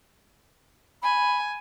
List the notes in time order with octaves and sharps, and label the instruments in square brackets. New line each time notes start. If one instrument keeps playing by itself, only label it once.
[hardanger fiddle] G#5 [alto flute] B5